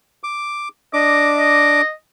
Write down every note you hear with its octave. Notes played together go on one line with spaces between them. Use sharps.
D6
D4 D#5 D6
D#5